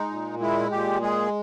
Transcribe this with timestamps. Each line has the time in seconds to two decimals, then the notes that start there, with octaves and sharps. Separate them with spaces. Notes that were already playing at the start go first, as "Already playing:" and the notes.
Already playing: G#3 D#4
0.09 A#2
0.40 G#3 E4
0.71 A#2 G4
1.01 G#3 G#4